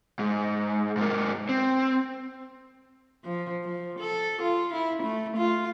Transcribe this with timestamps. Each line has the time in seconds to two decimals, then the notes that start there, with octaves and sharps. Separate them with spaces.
0.19 G#2
0.97 G#2 A#3
1.49 C4
3.24 F3
3.64 F3
3.99 A4
4.42 F4
4.74 E4
5.03 A3
5.37 F4